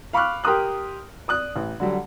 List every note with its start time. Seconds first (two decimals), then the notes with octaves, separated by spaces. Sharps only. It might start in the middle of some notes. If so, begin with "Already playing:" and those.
0.13 F5 B5 C#6 D6 F6 F#6
0.44 G4 A#4 C6 D#6 F#6
1.28 D5 D#6 F#6
1.56 A1
1.80 D3 F#3 G3